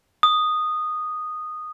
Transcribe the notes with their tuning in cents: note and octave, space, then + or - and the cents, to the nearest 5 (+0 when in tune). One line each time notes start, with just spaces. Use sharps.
D#6 -10